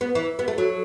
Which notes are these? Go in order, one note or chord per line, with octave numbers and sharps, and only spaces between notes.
B3
E3
B3
A3
F#3